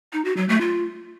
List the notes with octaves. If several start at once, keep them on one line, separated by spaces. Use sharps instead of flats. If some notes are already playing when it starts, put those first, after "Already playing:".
D#4
F#4
F#3
A3
F4